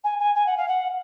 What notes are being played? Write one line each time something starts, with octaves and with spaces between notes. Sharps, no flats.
G#5
G#5
G#5
F#5
F5
F#5